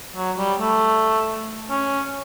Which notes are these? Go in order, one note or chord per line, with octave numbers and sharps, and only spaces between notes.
F#3
G3
A3
C#4